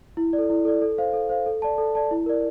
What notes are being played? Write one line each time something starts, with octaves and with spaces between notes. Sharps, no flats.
E4
D5
A4
E4
A4 D5
A4
C5 F5
A4
C5 F5
A4
D5 A5
A4
D5 A5
E4
A#4 D5